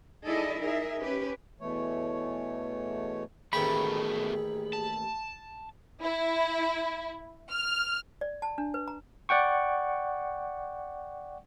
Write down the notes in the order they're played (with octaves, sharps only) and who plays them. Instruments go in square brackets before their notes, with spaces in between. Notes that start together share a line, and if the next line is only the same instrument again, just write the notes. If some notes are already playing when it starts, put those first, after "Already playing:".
[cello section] D#4 E4 G#4 A4 D5 D#5
D#4 G#4 A#4 E5
C#4 G4 B4
[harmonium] E2 B2 E3 A3 C#5
[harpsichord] A1 D#2 G5 [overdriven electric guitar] B2 A3 [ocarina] G#4 [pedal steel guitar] B5
[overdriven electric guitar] A5
[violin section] E4
F6
[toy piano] D5
A5
D4
B4
A#5
[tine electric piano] D5 F#5 G5 C#6